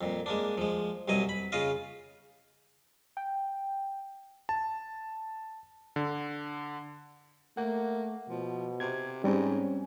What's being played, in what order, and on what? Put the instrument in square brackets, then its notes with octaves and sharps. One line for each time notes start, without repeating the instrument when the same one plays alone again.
[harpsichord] F2 A#2
G#3 A#3 D4
F3 G#3
C2 B2 F#3 D#5 G#5
B5
C#3 F4 D#5 F5
[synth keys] G5
[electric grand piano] A5
D3
[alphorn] A3 [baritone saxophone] A#3 [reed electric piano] F#5
[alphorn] B2 [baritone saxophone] F3
[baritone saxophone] C3 [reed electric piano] G#6
[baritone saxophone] G#2 [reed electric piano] G3 C4 [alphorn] C#4